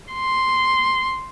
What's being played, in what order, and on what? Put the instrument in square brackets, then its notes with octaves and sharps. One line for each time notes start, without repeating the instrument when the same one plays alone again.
[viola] C6